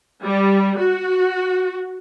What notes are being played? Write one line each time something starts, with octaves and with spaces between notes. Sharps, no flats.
G3
F#4